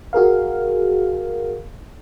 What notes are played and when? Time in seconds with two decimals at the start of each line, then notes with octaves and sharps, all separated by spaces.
0.13 F#4 G#4 A#4 F5